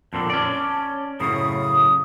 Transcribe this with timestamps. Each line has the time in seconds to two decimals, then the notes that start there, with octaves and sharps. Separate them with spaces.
0.13 F2 A#2 D3 A5
0.30 C#4 D5
1.20 F#2 A2 C#3 D#6